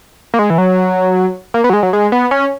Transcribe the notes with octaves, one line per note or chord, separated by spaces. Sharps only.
A#3
G#3
E3
F#3
A#3
B3
F#3
G#3
F#3
G#3
B3
C#4